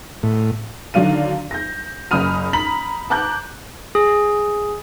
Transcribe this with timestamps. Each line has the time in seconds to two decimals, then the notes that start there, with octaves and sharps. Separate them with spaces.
0.23 A2
0.94 D3 D#3 F#3 D4 F5 D#7
1.51 G6 A#6
2.11 F#1 F#2 B5 D#6 F6 D#7
2.53 A#5 B5 B6 F#7
3.10 A5 A#5 D6 F#6 G6
3.95 G#4